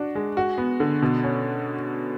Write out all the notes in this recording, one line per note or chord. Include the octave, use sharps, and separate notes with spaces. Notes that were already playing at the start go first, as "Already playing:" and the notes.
Already playing: D4 F#4
G#3
F#4
B3
D3
B2
C#4